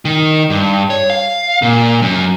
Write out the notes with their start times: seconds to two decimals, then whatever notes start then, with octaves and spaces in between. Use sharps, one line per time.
0.05 D#3
0.50 G2
0.90 C#5
1.10 F5
1.62 A#2
2.02 F#2